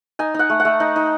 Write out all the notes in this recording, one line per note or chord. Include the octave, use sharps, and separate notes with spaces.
D#4 G#5
D#4 F#5
A3
F#5
A3
D#4
D#4